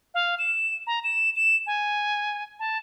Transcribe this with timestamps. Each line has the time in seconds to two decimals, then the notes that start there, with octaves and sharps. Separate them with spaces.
0.14 F5
0.39 E7
0.87 A#5
1.04 E7
1.36 E7
1.67 G#5
2.60 A5